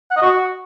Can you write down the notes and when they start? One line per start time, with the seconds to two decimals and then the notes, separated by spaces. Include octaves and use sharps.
0.11 F#5
0.16 D#5
0.22 F#4